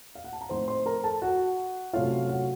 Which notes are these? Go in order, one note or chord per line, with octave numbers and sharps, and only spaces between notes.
F5
F#5
A5
A#5
A2 F3 C4 D#4 C5 C6
C5 C6
A#4 A#5
A4 A5
F#4 F#5
C3 F#3 A3 C#4 F4 F5
F#4 F#5